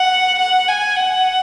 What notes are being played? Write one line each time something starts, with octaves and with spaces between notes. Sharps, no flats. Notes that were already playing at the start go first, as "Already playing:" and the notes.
Already playing: F#5
F#5
G#5
F#5